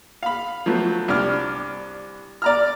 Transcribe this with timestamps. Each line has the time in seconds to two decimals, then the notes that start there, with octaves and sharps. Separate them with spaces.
0.23 F5 B5
0.66 F3 F#3 A3 B3
1.08 C2 D4 F6
2.42 D5 A#5 F6